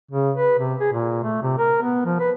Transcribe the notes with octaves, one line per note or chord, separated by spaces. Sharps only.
C#3
B4
C3
G#4
A#2
A3
C3
A#4
B3
F3
B4